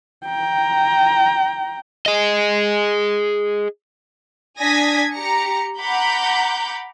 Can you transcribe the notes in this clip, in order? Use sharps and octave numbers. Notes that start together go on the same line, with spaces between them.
G5 A#5
G#4 D#5
D4 G#5 D#6 G#6 A#6 B6
G4 A#5 A#6 C#7
F#5 A#5 B5 D6 G6